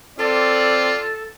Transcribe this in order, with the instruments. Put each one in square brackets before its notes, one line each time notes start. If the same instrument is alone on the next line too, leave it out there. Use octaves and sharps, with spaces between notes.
[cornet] C4 [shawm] F4 [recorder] A4 [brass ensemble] D5